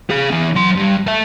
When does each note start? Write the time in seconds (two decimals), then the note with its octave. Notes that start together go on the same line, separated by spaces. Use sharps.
0.10 G#4 F5
0.31 E3 B3
0.55 F#3 C6
0.76 G2
1.07 A4 E5